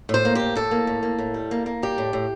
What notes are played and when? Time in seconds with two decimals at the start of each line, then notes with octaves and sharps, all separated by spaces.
0.09 A2 C5
0.25 A#3
0.35 A2 G4
0.55 A2 A4
0.71 A#3
0.87 A2
1.03 A#3
1.18 A2
1.34 G3
1.51 A#3
1.66 A#3
1.83 G3 G4
1.98 A2
2.13 A2